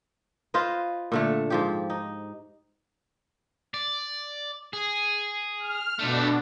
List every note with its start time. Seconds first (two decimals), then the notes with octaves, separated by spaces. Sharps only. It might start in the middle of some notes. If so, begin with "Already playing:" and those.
0.54 F4 B4 C5 D#5
1.12 A#2 D3 A3
1.50 G#2 F3 G4
1.90 D#4
3.74 D5
4.73 G#4
5.60 F6
5.99 B2 A3 D4 F4